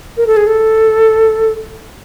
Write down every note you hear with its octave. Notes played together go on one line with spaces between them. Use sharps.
A#4
A4
G#4
A4